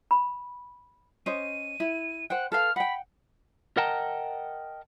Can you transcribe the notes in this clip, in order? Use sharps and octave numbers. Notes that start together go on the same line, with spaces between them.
B5
C#4 C5 D#5 D#7
E4
C5 F#5 G5 F#6
A4 B4 F5 F6
F#5 G5 B5
A#4 D#5 F#5 G5 A5 A#5